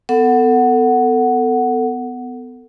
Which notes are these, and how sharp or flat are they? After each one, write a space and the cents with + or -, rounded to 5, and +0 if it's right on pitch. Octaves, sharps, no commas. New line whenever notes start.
B3 +25 A4 +25 F#5 +0